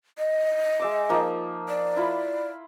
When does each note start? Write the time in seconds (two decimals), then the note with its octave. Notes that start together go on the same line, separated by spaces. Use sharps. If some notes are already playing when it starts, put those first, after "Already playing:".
0.18 D#5
0.80 G#3 E5 D6
1.09 F3 A#3 D#4
1.69 D5
1.96 E4 F4 B5